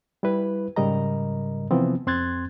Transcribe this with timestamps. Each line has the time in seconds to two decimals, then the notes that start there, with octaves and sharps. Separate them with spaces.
0.23 G3 E4 B4
0.76 G#2 C#3 G3 A#4 D#5 A#5
1.71 C3 E3 F3 B3 C4
2.07 F2 C4 C6 F#6 G#6 A6